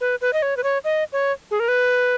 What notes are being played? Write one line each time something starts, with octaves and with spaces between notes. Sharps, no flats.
B4
B4
D#5
C#5
B4
C#5
D#5
C#5
G#4
A#4
B4